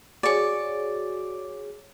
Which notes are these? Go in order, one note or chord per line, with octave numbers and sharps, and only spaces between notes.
F#4 G#4 C#5 D5 C#6